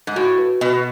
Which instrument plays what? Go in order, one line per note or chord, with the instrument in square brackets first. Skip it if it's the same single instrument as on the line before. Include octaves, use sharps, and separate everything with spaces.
[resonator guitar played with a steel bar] G#2
[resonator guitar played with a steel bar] A2 [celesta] F#4
[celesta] B4
[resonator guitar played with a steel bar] B2 [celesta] D#5